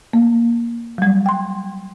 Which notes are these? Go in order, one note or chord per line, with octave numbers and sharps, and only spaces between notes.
A#3
F#3 G3
G5 C6